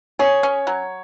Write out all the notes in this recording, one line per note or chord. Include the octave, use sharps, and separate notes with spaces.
G#4 C#5
C#4
F#3